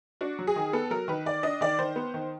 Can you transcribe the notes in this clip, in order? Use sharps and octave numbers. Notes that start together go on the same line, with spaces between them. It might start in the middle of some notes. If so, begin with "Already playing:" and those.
D4 F#4
F#3
G#4
D#3
B3 A4
F#3 A#4
D#3 B4
D#3 D5
D4 D#5
D#3 D5
D#3 C5
B3
D#3